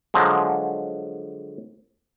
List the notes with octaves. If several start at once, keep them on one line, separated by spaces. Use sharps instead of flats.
D3 F3 F#3 G#3